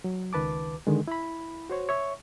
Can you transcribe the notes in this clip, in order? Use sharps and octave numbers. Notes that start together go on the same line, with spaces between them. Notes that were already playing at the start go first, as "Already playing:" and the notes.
F#3
C#2 D#3 B4 A5 D6
D3 D#3 G#3
E4 B5
F#4 C5 C#5
C#5 E5 C#6